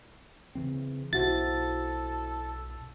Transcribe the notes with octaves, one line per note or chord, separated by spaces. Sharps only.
C#3 E3 C4
B1 E4 F#4 A4 C5 A6